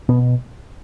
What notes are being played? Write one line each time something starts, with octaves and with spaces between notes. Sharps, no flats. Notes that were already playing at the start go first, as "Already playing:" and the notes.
B2 B3